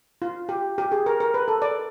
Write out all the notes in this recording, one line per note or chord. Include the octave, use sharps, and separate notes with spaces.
F4
G4
G4
G#4
A#4
A#4
B4
A4
D5